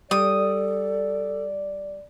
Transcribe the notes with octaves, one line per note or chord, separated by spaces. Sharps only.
G3 A4 D5 D#6